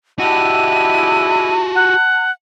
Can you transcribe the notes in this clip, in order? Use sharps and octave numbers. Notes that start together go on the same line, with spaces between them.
G#3 D4 E4 F#4 G4 A5 D#7
F#5